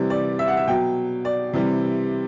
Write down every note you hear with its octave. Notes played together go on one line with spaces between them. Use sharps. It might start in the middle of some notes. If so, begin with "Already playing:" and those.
Already playing: C3 E3 G3
D5
E5
F#5
E5
B2 F#3 G5
D5
C3 E3 G3